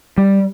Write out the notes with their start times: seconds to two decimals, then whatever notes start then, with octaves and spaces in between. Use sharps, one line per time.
0.18 G3